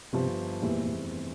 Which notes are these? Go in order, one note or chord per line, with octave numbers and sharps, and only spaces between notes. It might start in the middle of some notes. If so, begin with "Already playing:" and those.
G1 G2 C3 F3
F1 E2 A#2 E3 G3 C4